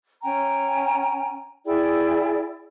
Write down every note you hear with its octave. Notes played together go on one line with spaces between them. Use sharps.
C#4 G5 G#5 A#5
E4 G#4 D5 G5